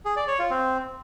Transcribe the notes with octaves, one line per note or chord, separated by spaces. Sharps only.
G#4
D5
C#5
F4
C4